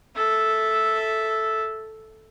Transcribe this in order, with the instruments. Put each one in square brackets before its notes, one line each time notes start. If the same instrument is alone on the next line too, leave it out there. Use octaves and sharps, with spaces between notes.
[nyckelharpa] A4 E5